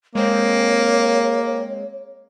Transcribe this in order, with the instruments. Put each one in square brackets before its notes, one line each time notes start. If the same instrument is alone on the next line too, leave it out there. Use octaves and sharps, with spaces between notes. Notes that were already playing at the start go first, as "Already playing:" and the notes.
[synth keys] G#3 C4 [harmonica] A#3 [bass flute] C#5